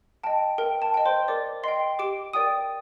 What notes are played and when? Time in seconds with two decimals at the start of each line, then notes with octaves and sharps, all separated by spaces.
0.23 D#5 G5 A5
0.58 A#4 G5
0.82 A5
0.94 D#5 G5
1.06 C5 C6
1.28 A#4 D5 D6
1.64 D#5 G5 C6 C7
1.99 G4 D6 D7
2.33 A#4 D5 G5 D#6 D#7